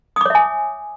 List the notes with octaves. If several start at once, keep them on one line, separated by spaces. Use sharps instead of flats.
C#5 E5 G#5 D6 D#6